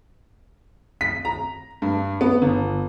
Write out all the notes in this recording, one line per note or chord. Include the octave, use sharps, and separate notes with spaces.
B6
A#5
G2
B3
G1